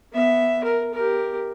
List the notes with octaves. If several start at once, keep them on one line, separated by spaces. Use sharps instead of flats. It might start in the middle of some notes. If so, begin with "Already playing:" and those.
B3 E5
A#4
G4 A#4